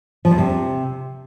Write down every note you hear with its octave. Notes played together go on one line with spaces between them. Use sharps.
F3
E2
C3